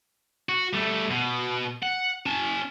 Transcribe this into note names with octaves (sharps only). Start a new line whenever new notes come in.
F#4
G3 A3
B2
F#5
C#4 A5